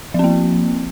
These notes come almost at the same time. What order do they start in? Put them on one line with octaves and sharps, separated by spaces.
F3 C4 A#3